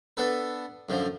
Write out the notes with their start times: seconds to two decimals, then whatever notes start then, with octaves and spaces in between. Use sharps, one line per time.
0.17 B3 D4 A4 B4
0.89 F#2 D3 F3